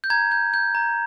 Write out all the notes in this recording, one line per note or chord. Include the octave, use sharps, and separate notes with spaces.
G6
A#5 G#6
G6
G6
A#5